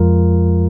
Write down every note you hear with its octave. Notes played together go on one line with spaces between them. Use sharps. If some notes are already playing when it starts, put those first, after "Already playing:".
Already playing: F2 F3 G#3 F4 A#4